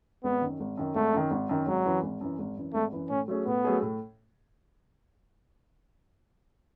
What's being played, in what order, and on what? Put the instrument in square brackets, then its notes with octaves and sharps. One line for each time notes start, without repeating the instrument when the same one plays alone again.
[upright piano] G#1 [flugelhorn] B3
[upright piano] F#2 D#3
G#1
F#2 D#3
[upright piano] G#1 [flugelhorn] A3
[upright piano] F#2 D#3
G#1
F#2 D#3
[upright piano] G#1 [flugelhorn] F#3
[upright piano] F#2 E3
G#1
F#2 E3
G#1
F#2 E3
[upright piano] G#1 [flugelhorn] A3
[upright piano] F#2 E3
[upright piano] A2 [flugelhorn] C#4
[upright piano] F#3 A3 C#4 G#4
[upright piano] A2 [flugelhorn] B3
[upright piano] F#3 A3 C#4 G#4
A2